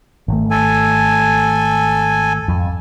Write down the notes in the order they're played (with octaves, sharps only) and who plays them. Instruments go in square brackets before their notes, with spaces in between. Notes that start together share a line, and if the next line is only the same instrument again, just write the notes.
[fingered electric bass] G#1 A3
[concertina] A4 G#5
[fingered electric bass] F2